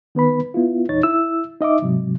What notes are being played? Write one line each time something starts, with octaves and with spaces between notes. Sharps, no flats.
D#3 B3 B4 B5
B3 E4 F4
E2 A#2 D#4 C#5 A6
E4 E6
D#4 D#5 E5 D6
G#2 C3 F#3